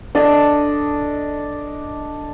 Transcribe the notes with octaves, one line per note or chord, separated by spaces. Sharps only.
D4 A4 D5 D#5